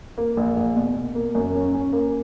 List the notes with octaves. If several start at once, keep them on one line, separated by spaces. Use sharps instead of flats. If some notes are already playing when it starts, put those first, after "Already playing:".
A#3
A#1
A#1
B2
B2
A#3
F#2
C#4
C#4
A#3